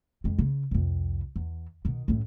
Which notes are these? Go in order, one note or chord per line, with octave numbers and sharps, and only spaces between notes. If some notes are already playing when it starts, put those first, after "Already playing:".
F2 G#3
C#3
C2 F2
E2
B2 D#3
F#2 A2